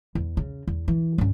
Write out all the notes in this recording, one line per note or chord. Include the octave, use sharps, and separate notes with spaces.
E2
C#3
E2
E3
G2 C#4